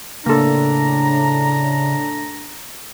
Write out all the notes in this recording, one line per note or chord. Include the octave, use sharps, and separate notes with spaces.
A2 C#3 A#3 D4 A4 A#5